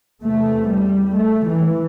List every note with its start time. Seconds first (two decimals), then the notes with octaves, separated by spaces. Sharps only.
0.22 E2 C3 A3
0.69 G3
1.16 A3
1.47 E3